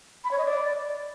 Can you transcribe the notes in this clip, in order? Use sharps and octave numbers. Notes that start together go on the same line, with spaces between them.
B5
C#5
D#5
D5